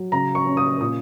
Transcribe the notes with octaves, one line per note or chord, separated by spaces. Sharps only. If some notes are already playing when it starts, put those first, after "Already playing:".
Already playing: F#3
C#3 A#5
C#6
C#4
D#6
A#2 D#6